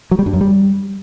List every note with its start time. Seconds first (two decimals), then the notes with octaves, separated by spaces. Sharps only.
0.11 F#3
0.19 G3
0.26 G2
0.33 F#2
0.41 G3